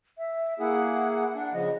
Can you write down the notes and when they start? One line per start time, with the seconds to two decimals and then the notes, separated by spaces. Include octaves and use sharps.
0.18 E5
0.60 A#3 E4 G#4 F#5
1.35 D4
1.53 C#3 F3 D#5